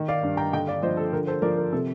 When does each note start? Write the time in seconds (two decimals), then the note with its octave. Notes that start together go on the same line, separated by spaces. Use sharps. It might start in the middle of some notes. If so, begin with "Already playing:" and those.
Already playing: D#3
0.08 D5 F5
0.23 G2
0.37 G5 A#5
0.53 D3 D#5 G5
0.67 D5 F5
0.82 F3 C5 D#5
0.97 A4
1.13 D3 A#4
1.27 A4 C5
1.42 F3 A#4 D5
1.57 A#4
1.73 C3 A4